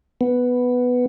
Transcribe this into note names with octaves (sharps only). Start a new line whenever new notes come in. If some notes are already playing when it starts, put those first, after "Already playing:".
B3